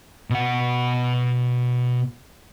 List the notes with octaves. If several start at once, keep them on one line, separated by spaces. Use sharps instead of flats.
B2 F#5